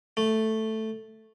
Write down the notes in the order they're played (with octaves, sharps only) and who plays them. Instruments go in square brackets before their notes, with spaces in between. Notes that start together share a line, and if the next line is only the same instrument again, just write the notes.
[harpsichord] A3